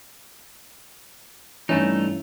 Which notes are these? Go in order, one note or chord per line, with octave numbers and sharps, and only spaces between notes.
G2 E3 A3 C#4 D#4 E4